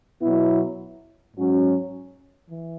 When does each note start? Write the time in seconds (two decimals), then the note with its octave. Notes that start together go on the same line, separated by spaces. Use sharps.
0.20 B2 F#3 B3 E4
1.35 G#2 F#3 C#4 F#4
2.49 E3